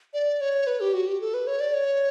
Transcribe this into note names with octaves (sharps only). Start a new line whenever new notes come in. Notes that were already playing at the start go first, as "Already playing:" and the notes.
D5
C#5
B4
G4
F#4
G4
A4
B4
C#5
D5
C#5